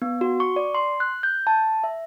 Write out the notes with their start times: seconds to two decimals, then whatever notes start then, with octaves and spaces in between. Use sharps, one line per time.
0.02 B3
0.21 F#4
0.40 C#6
0.56 D5
0.75 C6
1.00 F#6
1.23 G6
1.47 A5
1.84 E5